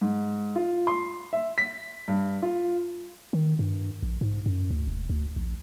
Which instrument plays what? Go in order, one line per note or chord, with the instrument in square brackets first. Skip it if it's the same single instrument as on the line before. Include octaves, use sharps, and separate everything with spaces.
[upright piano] G#2
F4
C6
E5
B6
G2
F4
[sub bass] D#3
G2
A#1
G#2
F#2
D2
E1
D2
A#1